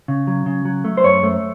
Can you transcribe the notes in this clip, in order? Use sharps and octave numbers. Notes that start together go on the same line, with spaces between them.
C#3
F#3
C#3
F#3
A3
C5
F#2 C#5
A3